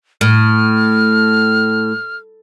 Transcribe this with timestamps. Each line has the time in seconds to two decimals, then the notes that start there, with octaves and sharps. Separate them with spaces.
0.21 A2 F6